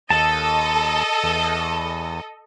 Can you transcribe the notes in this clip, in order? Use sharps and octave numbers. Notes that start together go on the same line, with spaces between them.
D#2 A4 D#5 A5
E2